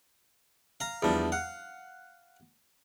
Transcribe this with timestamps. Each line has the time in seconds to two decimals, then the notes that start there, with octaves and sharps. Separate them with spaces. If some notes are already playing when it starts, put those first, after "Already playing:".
0.80 F5 A#5
1.02 E2 F3 G3 D4
1.32 F5 F#5